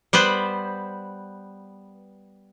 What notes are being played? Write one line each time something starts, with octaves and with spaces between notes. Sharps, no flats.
G3 B3 B4 C5